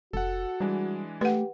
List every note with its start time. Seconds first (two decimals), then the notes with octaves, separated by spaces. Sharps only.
0.13 F1 F#4 A4 F#5
0.60 E3 G3 G#3 D4
1.21 A3 G4 B4 F#5